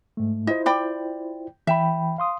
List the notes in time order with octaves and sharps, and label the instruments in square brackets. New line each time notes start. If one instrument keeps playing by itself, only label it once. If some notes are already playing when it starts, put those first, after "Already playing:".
[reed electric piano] G#2 A3
[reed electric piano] E4 F4 C5 [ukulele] D#5
[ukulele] D5 G5 B5
[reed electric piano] E3 G5 B5 [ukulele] E5
[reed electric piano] F5 C6 D#6